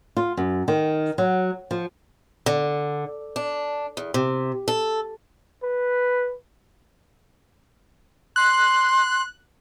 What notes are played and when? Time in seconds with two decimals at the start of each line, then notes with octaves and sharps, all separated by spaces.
0.17 F4
0.37 F#2
0.68 D#3
1.18 F#3
1.71 F3
2.46 D3
3.36 D4
3.97 E2
4.14 C3
4.68 A4
5.63 B4
8.36 C6 F#6